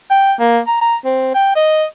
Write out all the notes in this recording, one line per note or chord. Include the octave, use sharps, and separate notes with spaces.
G5
A#3
A#5
A#5
C4
G5
D#5